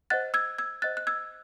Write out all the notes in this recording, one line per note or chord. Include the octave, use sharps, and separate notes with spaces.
C5 D#5 F#5 F#6 A6
E6 G#6
E6 G#6
C5 D#5 F#5 F#6 A6
F#6
E6 G#6